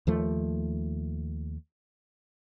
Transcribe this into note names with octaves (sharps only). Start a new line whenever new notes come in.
D#2 F3 A3